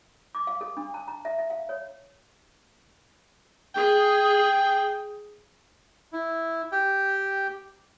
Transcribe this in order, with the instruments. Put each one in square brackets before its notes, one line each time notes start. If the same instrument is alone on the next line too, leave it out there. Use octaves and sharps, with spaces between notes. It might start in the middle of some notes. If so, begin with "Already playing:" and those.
[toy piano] D6
F5
A4
D4
A5
A#5
E5
E5
F5
C#5
[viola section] G#4 [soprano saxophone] G5
[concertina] E4
G4 G5